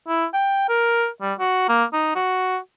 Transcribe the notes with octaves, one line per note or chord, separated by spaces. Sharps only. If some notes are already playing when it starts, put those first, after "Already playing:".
E4
G5
A#4
G3
F#4
A#3
D#4
F#4